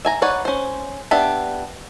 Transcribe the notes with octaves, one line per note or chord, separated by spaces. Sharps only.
E5 G#5 A#5
D#4 B4 C#5 D5 F#5
C#4 C5
B3 D4 G4 E5 B5